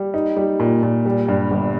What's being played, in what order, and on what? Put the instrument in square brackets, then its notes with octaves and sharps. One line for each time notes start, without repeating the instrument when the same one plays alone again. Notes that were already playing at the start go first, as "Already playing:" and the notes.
Already playing: [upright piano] G3
D#4
G3
A#2
A#2
G3
G2
G1